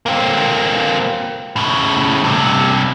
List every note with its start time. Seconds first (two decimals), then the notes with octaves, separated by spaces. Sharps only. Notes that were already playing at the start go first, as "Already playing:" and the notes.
0.06 A#3 C4
1.56 A2 C#3
2.24 G2 C3